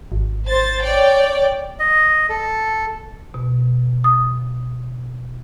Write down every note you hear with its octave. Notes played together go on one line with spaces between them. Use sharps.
G#1
C5 A6
C#5 D5 G5
D#5
A4
B2
D#6